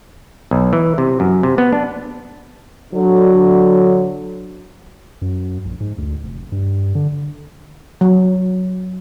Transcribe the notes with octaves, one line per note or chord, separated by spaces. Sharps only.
B1
E3
C3
F#2
C3
B3
D4
D3 F#3
F#2
A#1
G#2
D2
F1
G2
D3
F#3